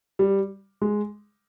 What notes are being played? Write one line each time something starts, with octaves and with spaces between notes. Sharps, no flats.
G3
G#3